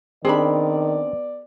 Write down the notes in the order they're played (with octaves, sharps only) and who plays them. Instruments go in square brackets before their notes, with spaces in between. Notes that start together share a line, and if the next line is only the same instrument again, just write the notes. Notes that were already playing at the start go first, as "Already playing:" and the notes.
[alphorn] D#3 [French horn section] B3 D5 [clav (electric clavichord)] C4 D4 [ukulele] G#4 A#4 B5